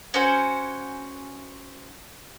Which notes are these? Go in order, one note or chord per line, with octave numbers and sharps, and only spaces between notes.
C#4 F#4 C5 G#5